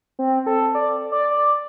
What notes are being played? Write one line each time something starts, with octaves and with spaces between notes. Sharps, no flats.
C4
A4
D5
D5
D5